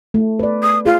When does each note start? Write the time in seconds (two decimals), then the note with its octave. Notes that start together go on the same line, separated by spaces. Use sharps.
0.14 A3
0.39 B4 D5
0.63 D#6
0.86 F4 G#4